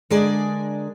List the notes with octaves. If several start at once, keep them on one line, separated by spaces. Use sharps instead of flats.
D3 G#3 D4 G#4 A#4 D5